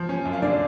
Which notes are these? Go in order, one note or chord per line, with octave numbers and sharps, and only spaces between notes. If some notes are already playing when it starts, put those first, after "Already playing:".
Already playing: F3
C#4
F#2
F5
D3 D5